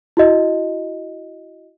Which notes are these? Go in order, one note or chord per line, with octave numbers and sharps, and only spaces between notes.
E4 F#4 D#5